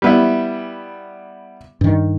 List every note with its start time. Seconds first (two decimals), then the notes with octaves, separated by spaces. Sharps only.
0.02 G3 B3 E4
1.81 G2 D#3